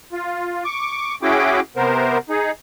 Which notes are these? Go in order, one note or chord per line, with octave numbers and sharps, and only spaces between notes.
F4
C#6 D6
C#4 E4 F#4 G#4 G5 D6
C3 B3 A#4 C5
D#4 G#4